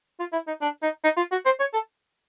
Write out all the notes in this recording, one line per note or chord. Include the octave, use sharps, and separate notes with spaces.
F4
E4
D#4
D4
D#4
D#4
F4
F#4
C5
C#5
A4